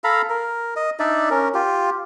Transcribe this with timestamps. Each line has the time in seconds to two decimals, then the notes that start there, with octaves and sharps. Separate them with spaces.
0.04 A4 F5 A#5 B5
0.30 A#4
0.76 D#5
0.99 D4 D#4 D5 E5
1.31 C#4 A#4
1.54 F4 G4